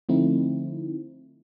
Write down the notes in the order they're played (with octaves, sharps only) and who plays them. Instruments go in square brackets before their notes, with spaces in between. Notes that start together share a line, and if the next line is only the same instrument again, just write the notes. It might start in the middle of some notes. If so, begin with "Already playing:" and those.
[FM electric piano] D3 F3 A3 C4 D#4 E4